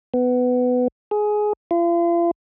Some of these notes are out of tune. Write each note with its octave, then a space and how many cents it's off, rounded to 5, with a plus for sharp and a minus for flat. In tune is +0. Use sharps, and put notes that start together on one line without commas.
B3 +15
G#4 +15
F4 -40